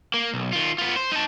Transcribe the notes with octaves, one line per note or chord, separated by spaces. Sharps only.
A#3
B1
D#3 F4
B3 F4
C5
D#4 A5